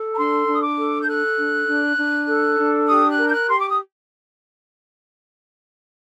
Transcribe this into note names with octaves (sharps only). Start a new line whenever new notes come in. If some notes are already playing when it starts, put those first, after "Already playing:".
Already playing: A4
A#5
D4 C6
D4
D#6
D6
A4
G6
A4 F#6
D4
D4
D4
A4
D4
G4 D#6
F#6
A#4
G6
F#6
G4 C6
D6
D#6